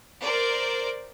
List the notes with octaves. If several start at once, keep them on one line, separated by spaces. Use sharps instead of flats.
A#4 C5 D5